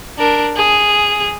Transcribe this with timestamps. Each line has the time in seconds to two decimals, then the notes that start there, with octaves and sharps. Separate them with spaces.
0.18 D4 A#4
0.56 G#4